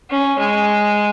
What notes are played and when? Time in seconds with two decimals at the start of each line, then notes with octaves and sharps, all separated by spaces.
0.10 C#4
0.39 G#3